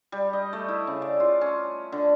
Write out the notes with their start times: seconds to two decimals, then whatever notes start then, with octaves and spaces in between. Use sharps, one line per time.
0.12 G3
0.33 D#5
0.53 A3
0.69 E4
0.87 C#3
1.02 D5
1.20 F4
1.41 C#4
1.92 D3